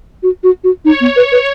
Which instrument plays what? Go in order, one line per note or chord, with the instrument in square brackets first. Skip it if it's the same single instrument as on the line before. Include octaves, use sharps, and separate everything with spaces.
[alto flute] F#4
F#4
F#4
[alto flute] D#4 [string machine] C#5
[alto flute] B3
B4
B4